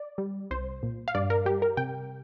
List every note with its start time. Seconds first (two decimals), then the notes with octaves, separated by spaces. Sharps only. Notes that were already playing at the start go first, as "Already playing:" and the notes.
Already playing: D5
0.18 G3
0.51 C2 C5
0.83 A#2
1.08 F5
1.14 G2 D5
1.30 A#4
1.46 G3 G4
1.62 A#4
1.77 C3 G5